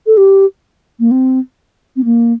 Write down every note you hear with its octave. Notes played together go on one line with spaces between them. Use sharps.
A4
G4
A#3
C4
C4
A#3